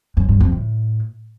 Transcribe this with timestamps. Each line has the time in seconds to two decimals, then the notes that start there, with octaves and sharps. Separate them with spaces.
0.17 F#2
0.29 G2
0.40 F2
0.52 A2